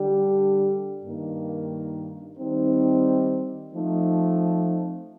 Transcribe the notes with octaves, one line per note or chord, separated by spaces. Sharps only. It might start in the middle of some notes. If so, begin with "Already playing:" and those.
Already playing: D3 G3 D4 G4
G2 D#3 A#3 D#4
D#3 G3 C4 D#4
F3 A3 C4 D#4